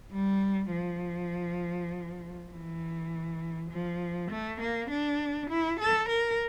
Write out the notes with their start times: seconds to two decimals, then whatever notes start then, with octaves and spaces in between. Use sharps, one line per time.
0.12 G3
0.72 F3
2.51 E3
3.70 F3
4.30 A3
4.60 A#3
4.90 D4
5.50 E4
5.79 A4
6.08 A#4